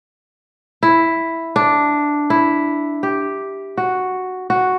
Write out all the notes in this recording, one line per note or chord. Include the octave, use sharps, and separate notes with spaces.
E4
D4
E4
G4
F#4
F#4